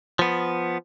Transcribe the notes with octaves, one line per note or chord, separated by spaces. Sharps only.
F3 B3